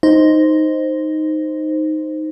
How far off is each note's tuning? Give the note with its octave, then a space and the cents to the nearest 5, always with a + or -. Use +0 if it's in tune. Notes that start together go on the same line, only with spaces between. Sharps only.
D#4 +0 C5 +0